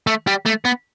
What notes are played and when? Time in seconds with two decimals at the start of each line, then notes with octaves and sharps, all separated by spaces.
0.07 A3
0.27 G3
0.46 A3
0.65 B3